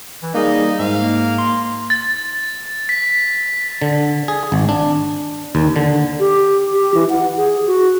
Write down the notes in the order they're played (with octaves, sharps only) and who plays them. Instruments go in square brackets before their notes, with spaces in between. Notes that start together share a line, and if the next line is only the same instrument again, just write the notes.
[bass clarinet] E3
[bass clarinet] G3 [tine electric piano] A#3 G#4 [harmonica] D#4
[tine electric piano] G#2 [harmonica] F5
[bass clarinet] A#3
[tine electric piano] C6
[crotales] A6
B6
[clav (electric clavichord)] D3
G#4
G#1
D4
D#2
D3
[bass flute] G4
G4
E3
F#5
G#4
F#4